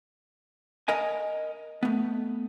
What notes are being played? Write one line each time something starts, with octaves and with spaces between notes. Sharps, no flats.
A#4 D#5 G#5
A3 B3